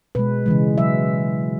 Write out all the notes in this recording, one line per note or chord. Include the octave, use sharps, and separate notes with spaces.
B2 G#3 B4
C#3 E3 G#3
C#3 F#3 E5